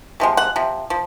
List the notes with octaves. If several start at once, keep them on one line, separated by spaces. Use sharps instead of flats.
C3 F3 G#3
F#5
C3 F3
F3